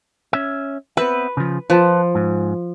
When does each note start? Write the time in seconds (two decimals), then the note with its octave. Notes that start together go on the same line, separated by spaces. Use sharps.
0.33 C#4 E5
0.97 B3 C4 B4 E5
1.37 C#3 F3
1.70 F3 B4 A5
2.15 G#2